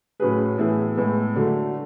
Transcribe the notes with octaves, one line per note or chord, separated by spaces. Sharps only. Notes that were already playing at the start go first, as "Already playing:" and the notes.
A2 F#3 C#4 G#4 B4
A2 E3 B3 E4 G#4
A2 G#3 B3
D3 F#3 A3